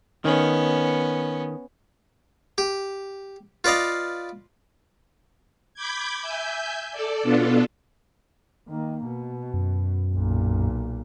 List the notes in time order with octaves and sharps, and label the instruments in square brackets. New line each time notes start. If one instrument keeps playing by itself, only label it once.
[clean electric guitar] D#3 [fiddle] B3 C#4
[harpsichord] G4
F4 B4 D5 D#5 F5
[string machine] B5 D6 G6 G#6
E5 G#5 G6
A4 D5
B2 B3 D4 F4 A4
[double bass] D#3 A#3
B2
[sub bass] F#2
[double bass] B1 A#2